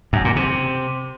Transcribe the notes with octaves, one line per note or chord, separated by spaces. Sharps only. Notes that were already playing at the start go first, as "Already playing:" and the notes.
F#2
A#2
C3